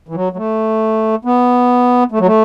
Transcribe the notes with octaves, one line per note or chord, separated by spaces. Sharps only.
E3
F#3
F#3
A3
B3
A3
F#3
A3